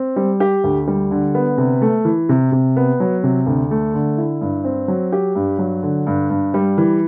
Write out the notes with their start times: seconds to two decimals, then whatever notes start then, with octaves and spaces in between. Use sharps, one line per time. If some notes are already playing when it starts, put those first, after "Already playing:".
Already playing: C4
0.16 G3
0.40 G4
0.64 D2
0.87 G3
1.11 D3
1.35 B3
1.58 C3
1.82 A3
2.05 E3
2.29 C3
2.52 C3
2.77 B3
3.00 F#3
3.23 C3
3.47 D2
3.71 A3
3.94 D3
4.18 E4
4.41 G2
4.64 C4
4.88 F#3
5.12 G4
5.35 G2
5.59 F#3
5.83 D3
6.07 G2
6.30 G2
6.54 G3
6.78 E3